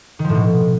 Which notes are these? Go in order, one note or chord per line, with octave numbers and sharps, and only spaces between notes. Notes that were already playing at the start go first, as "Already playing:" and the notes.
D#3
F3
A2
B2